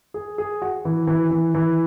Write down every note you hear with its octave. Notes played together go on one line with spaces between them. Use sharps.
G#4
G#4
F#4
E3
E3
E3
E3